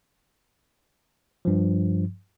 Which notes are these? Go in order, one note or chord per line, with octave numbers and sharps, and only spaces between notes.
G2 F3